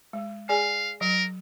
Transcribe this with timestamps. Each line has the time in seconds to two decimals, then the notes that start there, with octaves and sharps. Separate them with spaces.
0.13 G#3
0.49 G#4 D5 F5 G#5
1.01 F#3 A#4